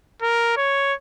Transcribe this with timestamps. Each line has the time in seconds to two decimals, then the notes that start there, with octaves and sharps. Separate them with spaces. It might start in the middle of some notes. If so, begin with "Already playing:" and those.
0.22 A#4
0.57 C#5